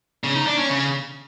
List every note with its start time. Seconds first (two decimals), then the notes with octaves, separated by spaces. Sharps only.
0.24 C#3
0.35 D#4
0.47 D4
0.58 C#4
0.70 C#3